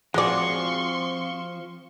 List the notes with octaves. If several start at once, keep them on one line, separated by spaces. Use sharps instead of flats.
F3 G#3 C4 F#4 G#4 D5 C6 C#6